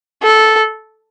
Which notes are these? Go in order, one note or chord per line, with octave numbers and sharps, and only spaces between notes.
A4